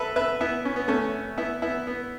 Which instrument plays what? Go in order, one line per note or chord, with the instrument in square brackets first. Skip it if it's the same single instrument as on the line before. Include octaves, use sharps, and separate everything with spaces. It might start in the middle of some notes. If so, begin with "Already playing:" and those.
Already playing: [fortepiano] A4 B4 E5
B4 E5
B3 E4
C#4
B3
A3 C#4
B3 E4
B3 E4
B3